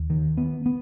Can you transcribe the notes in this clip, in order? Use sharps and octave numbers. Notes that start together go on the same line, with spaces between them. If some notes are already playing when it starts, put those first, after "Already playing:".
Already playing: D#2
D#3
B3
B3